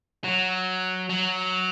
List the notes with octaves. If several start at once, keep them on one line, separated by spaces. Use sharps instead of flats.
F#3
F#3